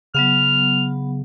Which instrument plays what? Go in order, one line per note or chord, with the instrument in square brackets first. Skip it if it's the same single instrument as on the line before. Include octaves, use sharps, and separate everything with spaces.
[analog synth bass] C#3 [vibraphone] F#3 B3 F#5 [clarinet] F6